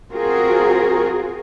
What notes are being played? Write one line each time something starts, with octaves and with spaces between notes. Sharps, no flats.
C4 F4 F#4 G#4 A#4